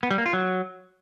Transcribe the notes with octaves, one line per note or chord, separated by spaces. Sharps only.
B3
G3
A#3
F4
F#3